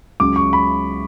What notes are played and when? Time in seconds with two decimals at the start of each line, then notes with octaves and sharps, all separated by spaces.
0.20 C#2 C#3 F#3 D6
0.36 C#6
0.53 B5